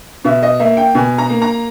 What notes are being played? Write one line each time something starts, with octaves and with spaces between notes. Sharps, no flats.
B2 E5
D#5
A#3 E5
G5
B2 G#5
A#5
A#3
A#5